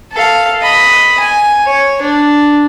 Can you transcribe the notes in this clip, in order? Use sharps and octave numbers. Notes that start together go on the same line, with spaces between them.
A4 F5
D#5 B5
G#5
C#5
D4